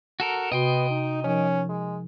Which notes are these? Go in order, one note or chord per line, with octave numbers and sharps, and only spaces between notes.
F#4 A4 A#4
C3 B3 F#4 D#5 G5 C6
D#4
F3 C#4 D#4 A#4
G#3